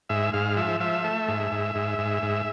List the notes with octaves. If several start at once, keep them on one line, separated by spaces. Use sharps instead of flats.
G#2 E5
G#2 F5
F3 E5
F3 E5
A3
G#2
G#2
G#2
G#2
G#2